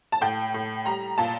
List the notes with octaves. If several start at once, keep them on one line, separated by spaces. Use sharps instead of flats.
A5
A2 G5
A2
G3 A#5
A#2 A5